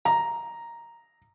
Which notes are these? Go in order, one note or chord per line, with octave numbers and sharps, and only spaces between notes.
A#5